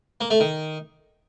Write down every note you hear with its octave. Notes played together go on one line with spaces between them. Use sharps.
A#3
A3
D#3